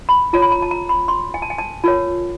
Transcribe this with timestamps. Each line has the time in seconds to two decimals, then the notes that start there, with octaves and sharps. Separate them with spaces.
0.09 B5
0.33 F4 A4 C#5 A#5
0.42 B5
0.52 A#5
0.62 A5
0.71 A#5
0.89 B5
1.08 C6
1.34 G#5
1.42 A5
1.50 G#5
1.58 A5
1.84 F4 A#4 C#5 A5